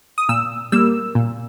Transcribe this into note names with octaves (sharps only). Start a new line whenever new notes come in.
D#6
A#2 E6
G3 A#3 E6
A#2